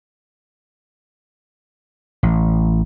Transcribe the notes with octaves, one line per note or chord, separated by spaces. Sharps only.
A1